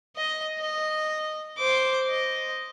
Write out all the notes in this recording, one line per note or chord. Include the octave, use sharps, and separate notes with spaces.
D#5
D#5
C5 D6
D#5